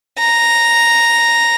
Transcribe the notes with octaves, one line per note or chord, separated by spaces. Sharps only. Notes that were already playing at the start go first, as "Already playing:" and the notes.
A#5